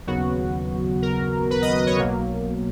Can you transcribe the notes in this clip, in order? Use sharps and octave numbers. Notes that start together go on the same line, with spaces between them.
D#2 C#3 F#3 B3 F#4
A#4
B4
D#5
D#5
C#5
B1 B2 F#3 A#3